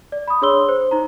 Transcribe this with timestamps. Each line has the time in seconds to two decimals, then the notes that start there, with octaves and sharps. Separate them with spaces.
0.12 D5
0.28 B5 D#6
0.41 D4 G#4 C#5 C6 E6 G7
0.69 C5
0.91 D#4 A#5